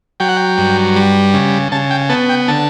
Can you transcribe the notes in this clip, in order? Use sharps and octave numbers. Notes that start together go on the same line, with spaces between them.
F#3 G5
F#5
G5
G2
G3
C#3
C#3 A5
G5
B3 A5
G5
D3 A5